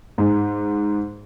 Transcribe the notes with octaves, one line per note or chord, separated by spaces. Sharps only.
G#2